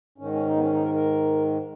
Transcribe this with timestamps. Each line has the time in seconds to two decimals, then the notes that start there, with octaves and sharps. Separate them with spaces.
0.18 G#2 D#3 C#4
0.33 C#4
0.47 D#4
0.56 B3
0.62 C#4
0.73 D#4
0.84 A#4
0.94 A#4